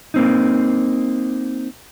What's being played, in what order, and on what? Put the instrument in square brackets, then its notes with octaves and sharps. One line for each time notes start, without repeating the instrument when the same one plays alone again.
[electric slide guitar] A#3 C4 D#4